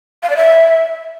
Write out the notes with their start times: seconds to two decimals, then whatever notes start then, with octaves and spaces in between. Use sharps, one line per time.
0.23 F5
0.30 D5
0.37 E5